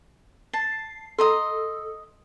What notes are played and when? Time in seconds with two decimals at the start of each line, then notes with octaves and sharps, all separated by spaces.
0.53 A5 C7
1.18 A4 D#5 A#5 C6